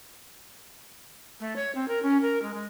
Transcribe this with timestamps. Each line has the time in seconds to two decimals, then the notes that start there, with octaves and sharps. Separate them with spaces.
1.40 A3
1.56 C#5
1.75 C4
1.88 A#4
2.02 C#4
2.22 A#4
2.42 G#3
2.54 G#3